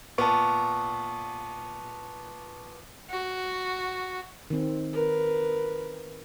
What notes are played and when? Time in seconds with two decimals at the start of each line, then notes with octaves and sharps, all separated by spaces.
0.18 A#2 B3 A5 C#6
3.09 F#4
4.50 D#3 C4
4.93 A#4 B4